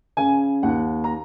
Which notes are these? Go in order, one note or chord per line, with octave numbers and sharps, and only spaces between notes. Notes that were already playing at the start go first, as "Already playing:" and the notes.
C#3 G#5
D#2 F#5
A#5